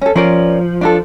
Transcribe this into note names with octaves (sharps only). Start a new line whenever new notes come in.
C#4 A4
F3 C#4 A#4 D5
D4 F4 A4